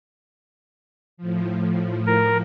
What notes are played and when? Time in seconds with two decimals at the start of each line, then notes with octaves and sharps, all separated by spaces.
1.17 A2 F3
2.07 A#4